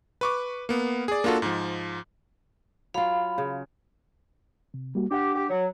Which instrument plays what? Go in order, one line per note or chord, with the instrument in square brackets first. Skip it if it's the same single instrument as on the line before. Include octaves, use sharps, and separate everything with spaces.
[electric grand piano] B4 C#6 D6
A#3 B3
G#4 D5
A#3 D4 F4 F#4 A4
G#2 F3
[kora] F#3 F4 [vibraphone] F5 B5
[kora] C#3
[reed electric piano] C3
G3 A#3 F#4
[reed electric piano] D4 F#5 [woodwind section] G4
[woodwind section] G4
F#3